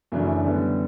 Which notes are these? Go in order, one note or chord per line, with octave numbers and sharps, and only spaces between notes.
F#2 C#3 E3 A3 D4
D3 G3 B3